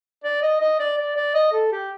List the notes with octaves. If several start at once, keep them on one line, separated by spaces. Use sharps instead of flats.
D5
D#5
D#5
D5
D5
D5
D#5
A4
G4